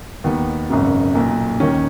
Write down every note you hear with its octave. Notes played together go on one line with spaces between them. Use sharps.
D#2 D#3 B3
G#1 F#2 C#3
B1 A#2
D#2 D#3 C#4